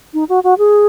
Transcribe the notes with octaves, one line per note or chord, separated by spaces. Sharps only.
D#4
F#4
F#4
G#4